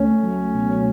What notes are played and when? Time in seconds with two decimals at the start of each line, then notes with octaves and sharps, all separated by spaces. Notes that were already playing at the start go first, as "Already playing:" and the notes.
Already playing: C#2 A3 C#4
0.23 F#3
0.54 B2